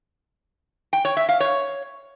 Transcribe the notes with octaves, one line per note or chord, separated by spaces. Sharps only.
G5
C#5
E5
F5
C#5